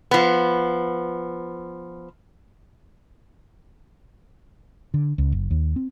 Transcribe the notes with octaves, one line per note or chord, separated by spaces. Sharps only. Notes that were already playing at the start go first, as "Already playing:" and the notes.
F3 B3
D3
C#2
F#1
D#2
C4